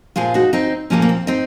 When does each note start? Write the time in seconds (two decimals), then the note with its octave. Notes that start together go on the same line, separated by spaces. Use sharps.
0.16 A#2 F3 G#3 F4 G#4
0.34 D#4 F#4
0.53 C4 D#4
0.90 A#2 F3 G#3 A#3 C#4
1.02 A#3
1.09 C4
1.27 C4 D#4